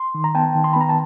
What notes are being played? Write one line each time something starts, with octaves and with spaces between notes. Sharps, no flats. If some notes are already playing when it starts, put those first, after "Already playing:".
Already playing: C6
D#3
A#5
B3 G5 A5
D#3
C6
B5
B3 A#5
A5